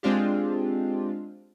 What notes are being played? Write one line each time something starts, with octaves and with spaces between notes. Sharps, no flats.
G#3 C4 D4 F4 G4